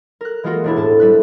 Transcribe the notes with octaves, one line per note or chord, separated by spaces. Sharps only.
A#4 F#6
E3 G#3 A#3 F4 F#4 A#4
E1 D4 E4
A2 A5
G3 E5 F#6